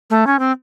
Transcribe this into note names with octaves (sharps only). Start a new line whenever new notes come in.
A3
C#4
C4